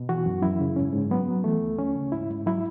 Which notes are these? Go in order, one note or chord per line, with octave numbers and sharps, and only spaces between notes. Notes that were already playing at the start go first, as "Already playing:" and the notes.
Already playing: B2
E3 F#4
F#2
F#2 E4
C#3
G#2 C#4
G#2
F#3 B3
F#3
E3 A3
D2
D2 C#4
C#3
G#2 E4
G#2
F#3 E4